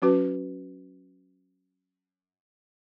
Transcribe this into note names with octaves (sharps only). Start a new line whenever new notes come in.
F#3 C#4 F#4 B4